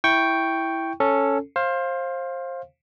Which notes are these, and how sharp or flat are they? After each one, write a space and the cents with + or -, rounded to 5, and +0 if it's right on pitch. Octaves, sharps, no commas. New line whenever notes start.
E4 +0 G5 +0 C#6 +0
C#4 +0 A4 +5
C5 +25 F5 +0